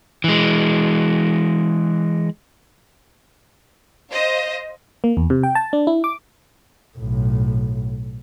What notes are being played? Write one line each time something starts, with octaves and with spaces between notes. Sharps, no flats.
E3 G#3
C5 D#5 F5
A#3
E2
C3
G5
A5
D4
E4
D6
B1 A2